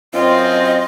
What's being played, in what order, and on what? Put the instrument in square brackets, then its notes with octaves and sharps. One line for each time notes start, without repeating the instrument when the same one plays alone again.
[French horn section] F#2 C4 [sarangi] F4 [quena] D#5